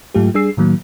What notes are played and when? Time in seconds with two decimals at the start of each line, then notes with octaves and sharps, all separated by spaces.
0.14 G#2 F#3 A3 F4 G4
0.34 G3 D4 G#4 E6 C7
0.57 A2 D#3 F#3 A#3